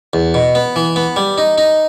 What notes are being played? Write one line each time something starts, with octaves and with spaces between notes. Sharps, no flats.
E2
B2
B3
E3
B3
G3
D#4
D#4